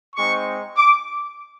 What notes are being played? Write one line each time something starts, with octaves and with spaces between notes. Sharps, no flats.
G#3 C4 D#4 C#6
D6